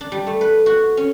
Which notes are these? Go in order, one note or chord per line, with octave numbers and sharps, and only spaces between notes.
D4
G3
A3
B4
F#4
C#4